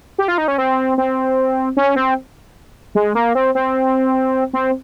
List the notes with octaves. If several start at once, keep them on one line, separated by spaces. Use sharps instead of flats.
G4
F4
D#4
C#4
C4
C4
C#4
C4
G#3
A#3
C4
C4
C4